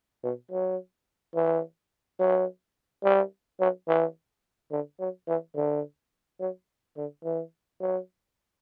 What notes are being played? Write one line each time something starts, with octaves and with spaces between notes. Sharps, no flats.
B2
F#3
E3
F#3
G3
F#3
E3
D3
F#3
E3
D3
F#3
D3
E3
F#3